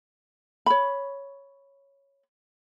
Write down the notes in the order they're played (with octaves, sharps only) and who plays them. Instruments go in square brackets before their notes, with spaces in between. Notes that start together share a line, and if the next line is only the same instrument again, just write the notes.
[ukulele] C#5 B5